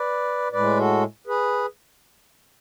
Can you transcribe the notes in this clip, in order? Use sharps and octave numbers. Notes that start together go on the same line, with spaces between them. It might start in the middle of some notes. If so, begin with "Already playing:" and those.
Already playing: B4 D5
A2 G#3 B4 D5
F#4 A4
G#4 B4